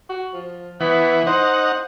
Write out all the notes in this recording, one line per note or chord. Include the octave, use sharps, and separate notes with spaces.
F#4
F3
E3 B3
D#4 C5 F#5